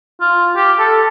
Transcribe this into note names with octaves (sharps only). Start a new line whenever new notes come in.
F4
G4
A4